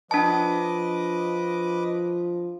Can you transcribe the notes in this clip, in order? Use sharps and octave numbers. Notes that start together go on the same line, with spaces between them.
F3 D4 B4 D#5 A5 D6